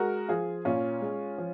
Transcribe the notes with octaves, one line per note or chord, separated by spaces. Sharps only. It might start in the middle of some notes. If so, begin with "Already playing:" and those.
Already playing: G#3 F#4 A#4
F3 F4 G#4
A#2 C#4 F4
G#3
F3